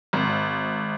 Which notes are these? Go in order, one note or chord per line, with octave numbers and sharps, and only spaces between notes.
G#1